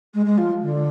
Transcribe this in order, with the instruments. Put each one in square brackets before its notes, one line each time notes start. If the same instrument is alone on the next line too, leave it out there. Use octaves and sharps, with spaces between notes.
[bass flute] G#3
G#3
F3
D3